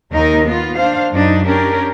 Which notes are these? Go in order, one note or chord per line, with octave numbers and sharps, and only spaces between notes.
D#2 D#3 D#4 A#4 D#5
B3 F4
D4 C5 F5
F#2 D4 D#4
C#4 D4 G4 A#4